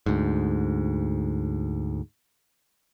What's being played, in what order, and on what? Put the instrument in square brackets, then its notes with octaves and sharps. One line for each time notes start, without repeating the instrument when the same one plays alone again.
[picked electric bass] D2 G#2